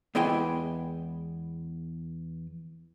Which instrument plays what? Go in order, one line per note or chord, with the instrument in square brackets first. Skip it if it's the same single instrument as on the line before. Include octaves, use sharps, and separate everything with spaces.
[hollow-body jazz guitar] E2 G#3 B3 E4 G5 G#5